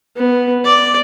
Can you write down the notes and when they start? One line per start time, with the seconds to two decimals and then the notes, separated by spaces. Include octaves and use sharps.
0.17 B3
0.65 D5